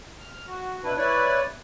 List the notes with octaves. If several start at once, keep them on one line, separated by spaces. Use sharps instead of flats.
F6
F#4
B2 D4 E4 B4
E4 B4 C#5 D5